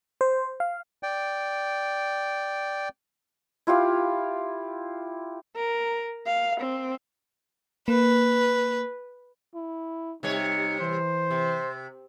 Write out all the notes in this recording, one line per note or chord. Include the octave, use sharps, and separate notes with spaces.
C5
F5
D5 G5
E4 F4 G4 F5
A#4
F5
C4
A#3 B4
E4
C3 G3 D#4 C#5
E3 C5
C3